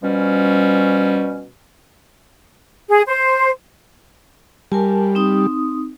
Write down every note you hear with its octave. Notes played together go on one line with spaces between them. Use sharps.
B2 F3 G3 C#4
G#4
C5
G3 A#4 G#5 A5
C4 D#4 D#6